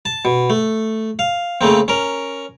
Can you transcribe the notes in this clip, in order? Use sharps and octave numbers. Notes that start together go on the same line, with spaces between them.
A5
B2
A3
F5
C#3 A3 A#3 C4
C#4 A#4